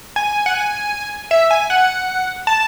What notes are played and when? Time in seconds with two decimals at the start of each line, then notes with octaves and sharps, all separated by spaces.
0.16 G#5
0.46 F#5
0.55 G#5
1.31 E5
1.51 G#5
1.70 F#5
2.47 A5